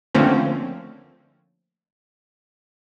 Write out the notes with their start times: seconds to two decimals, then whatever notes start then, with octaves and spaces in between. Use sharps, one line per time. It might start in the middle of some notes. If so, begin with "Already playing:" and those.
0.15 D3 F3 A3 A#3 C4 C#4